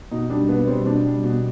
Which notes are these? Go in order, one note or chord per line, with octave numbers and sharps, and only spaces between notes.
B2 D#4
G3 D4
B2 B3
B3
G3 C4
B2 D4
G3
B2